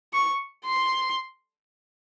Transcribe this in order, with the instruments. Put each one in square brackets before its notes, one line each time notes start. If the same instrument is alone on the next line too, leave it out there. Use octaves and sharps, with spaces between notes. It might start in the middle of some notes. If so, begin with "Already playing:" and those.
[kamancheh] C#6
C6